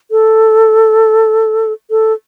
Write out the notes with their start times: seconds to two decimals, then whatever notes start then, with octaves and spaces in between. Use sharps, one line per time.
0.11 A4
1.91 A4